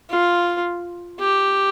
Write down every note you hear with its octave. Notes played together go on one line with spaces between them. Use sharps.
F4
G4